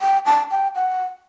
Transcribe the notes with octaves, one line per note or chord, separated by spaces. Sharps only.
G5
A5
G5
F#5